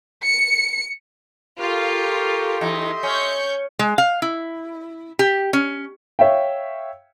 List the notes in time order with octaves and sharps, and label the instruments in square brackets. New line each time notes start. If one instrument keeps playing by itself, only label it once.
[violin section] C#7
[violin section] F4 [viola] G4 A4 [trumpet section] A#4 C#6
[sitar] E2 D#4 [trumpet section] D#5 E5 C6
[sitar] C#4 [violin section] C#6 G6
[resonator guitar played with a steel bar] G#3
F5
E4
G4
C#4
[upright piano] C#5 E5 F5 G5